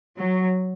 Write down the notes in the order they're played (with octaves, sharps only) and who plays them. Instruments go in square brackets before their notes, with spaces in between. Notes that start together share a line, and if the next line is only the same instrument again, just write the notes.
[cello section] F#3